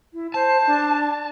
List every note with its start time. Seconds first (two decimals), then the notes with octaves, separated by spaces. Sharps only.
0.14 E4
0.34 C5 A5
0.67 D4